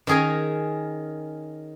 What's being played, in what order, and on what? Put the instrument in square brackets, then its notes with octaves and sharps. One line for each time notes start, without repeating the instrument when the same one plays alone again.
[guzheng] D#3 C#4 G#4 A#4 G#5